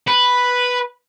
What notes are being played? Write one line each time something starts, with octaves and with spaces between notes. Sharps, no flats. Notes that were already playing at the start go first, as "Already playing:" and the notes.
B4